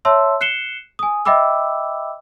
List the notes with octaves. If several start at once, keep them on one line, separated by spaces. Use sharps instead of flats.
C#5 E5 A5 C6 E6
F#6 C7 C#7 E7 G7
G#5 D#6
D#5 E5 G5 B5 D6 E6